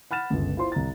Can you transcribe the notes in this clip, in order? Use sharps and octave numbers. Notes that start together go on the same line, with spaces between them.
F#5 B5 F6 A6 E7
G1 C#2
E4 F4 C5 C6
C2 A#5 A6